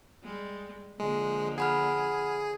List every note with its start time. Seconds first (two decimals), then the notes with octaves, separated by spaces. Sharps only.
0.24 G3 G#3
1.00 D3 F3 G#3 A#3
1.58 G#4 F#5 B5 F6